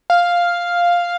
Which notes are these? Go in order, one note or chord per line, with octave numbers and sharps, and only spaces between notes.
F5